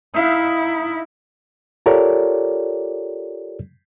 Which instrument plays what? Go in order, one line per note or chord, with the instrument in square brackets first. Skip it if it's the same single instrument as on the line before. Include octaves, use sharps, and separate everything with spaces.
[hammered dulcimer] D#4 E5 F5 [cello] E4
[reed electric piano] F4 G4 A4 A#4 C#5 D5